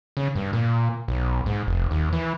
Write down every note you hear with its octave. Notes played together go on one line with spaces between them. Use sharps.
C#3
G2
A#2
B1
G#2
F1
D#2
E3